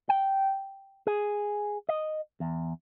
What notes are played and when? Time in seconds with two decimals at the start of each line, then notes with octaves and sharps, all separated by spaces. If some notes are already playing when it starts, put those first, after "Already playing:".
0.09 G5
1.07 G#4
1.89 D#5
2.40 E2